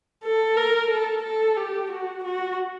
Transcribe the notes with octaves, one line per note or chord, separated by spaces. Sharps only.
A4
A#4
A4
A4
G4
F#4
F#4